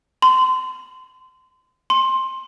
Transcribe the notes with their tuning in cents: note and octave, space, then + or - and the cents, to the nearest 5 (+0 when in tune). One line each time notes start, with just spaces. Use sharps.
C6 -30
C6 +15